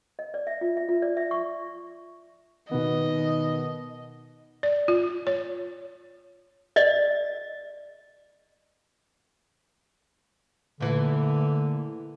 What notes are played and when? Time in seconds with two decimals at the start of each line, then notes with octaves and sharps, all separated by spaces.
0.19 D#5
0.34 D5
0.47 E5
0.61 F4
0.77 E5
0.89 F4
1.02 D5
1.17 E5
1.31 C#6
2.71 B2 D#3 B3 D#5
4.63 D5
4.88 F4
5.27 C#5
6.76 D5 D#5
10.80 A#2 D3 E3 A3